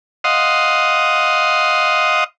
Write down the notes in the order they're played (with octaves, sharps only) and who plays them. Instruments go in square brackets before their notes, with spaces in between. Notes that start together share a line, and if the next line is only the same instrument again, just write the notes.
[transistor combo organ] D#5 F5 F#5 C6 D#6